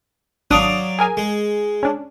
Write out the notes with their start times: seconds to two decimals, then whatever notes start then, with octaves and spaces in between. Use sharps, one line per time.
0.51 G#1 F#3 D4 D5 F5 D#6
0.99 G#4 A#4 G#5
1.17 G#3
1.83 C#4 D4